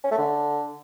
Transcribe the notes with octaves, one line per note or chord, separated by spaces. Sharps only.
C#4
A3
D3